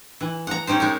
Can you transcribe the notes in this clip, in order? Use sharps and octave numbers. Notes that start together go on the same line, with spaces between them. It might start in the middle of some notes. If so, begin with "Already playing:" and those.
E3
F#5 A#5
C#4 D#4 G4 C5
G#3 D#4 A#4